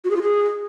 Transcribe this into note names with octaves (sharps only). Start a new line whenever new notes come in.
F#4
G#4
F4
G#4